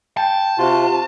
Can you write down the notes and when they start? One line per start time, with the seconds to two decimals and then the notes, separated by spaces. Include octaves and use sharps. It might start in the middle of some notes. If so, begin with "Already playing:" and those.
0.17 G5 A5
0.58 C3 F4 F#4